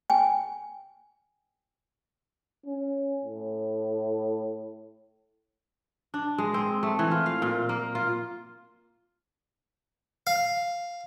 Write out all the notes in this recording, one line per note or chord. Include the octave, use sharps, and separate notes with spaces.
G5 G#5
C#4
A2
D4
G#3
C4
A3
E3
F4
F5
A#2
A#3
F4
F5